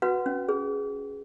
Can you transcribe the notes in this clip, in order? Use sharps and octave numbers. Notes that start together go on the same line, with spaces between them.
F#4 B4 F#5
C#4
G#4